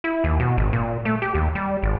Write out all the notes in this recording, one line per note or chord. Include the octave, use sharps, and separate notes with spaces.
E4
D#2
B2
G#1
A#2
A3
G4
D#2
G3
G#1